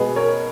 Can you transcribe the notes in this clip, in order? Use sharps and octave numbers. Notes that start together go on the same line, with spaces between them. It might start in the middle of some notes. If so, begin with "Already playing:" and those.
Already playing: B2 G#3 B3 G#4 B4
A#4 C#5